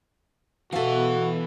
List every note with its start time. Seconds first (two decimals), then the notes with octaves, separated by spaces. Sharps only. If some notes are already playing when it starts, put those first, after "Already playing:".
0.72 B2 E3 F#4 A4 E5 F5